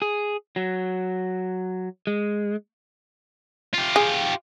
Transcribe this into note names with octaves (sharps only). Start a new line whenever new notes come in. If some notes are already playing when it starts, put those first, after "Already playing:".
G#4
F#3
G#3
F4 G4
G#4